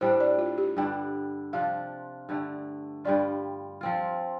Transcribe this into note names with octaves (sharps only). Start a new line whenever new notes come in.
A2 G3 D4 C5
D5
F4
G4
G2 D3 G3 D4 G5
C3 F3 D4 F4 F5
G2 D3 A3
G2 G3 F4 D5
F3 C4 F4